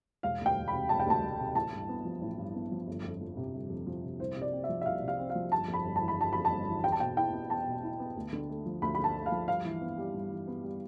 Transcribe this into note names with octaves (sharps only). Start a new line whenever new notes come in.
E1 F5
D2
G5
E1
B5
C3
E1 A5
G5
D2 A5
E1
C3
A1 A5
G2
B3
F3
A1
G2
B3
F3
G1
F2
F3
C3
G1
F2
F3
C3
C2 C5
C3
D5
C4
E5
F3
E5
C2 F5
C3
F5
C4
F5
F3
G1 A5
F2
B5
G1
A5
E3
B5
G1 A5
F2 B5
A5
G1
E3
E2 G5
A5
B2 G5
E4 G5
B3
E2 A5
B2
E4
B3
D2
D3
A3
F3
D2 B5
D3 B5
A5
A3
F5
F3
G2 F5
E3
B3
G3
G2
E3
B3
G3